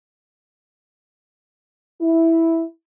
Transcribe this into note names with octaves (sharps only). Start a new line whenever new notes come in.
E4